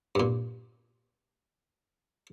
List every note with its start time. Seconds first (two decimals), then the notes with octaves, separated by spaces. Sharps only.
0.15 G2 A#2